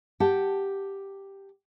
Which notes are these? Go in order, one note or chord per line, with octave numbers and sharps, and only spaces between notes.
G4 F#5 G5 A5